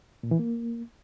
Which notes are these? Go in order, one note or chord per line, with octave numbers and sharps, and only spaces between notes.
A#2
E3
A#3